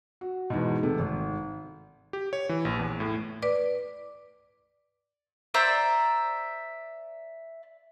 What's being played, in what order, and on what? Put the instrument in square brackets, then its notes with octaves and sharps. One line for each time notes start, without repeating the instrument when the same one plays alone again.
[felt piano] F#4
E2 G#2 B2
C3 A3
G#1
[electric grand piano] G4
C#5
E3
A#1
E2
A2
[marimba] B4 D5 D6
[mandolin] C5 D5 E5 A#5